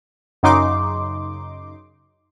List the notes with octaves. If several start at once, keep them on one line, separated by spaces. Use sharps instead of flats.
F#2 C#3 D#4 C6 D6